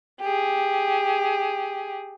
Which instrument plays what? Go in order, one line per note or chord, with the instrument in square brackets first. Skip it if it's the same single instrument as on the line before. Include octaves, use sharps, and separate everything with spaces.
[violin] G4 G#4